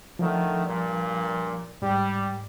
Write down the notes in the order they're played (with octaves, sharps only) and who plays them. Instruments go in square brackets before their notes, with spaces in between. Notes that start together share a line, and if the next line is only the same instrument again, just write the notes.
[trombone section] D3 D#3 A3 [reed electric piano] F3
[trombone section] G2 A#2
[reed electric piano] G#2 [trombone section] G3